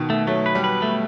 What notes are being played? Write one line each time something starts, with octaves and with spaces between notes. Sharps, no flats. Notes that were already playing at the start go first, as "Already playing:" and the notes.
Already playing: B2 D#3
A3
F#3 A3
B4
G3
B4
A3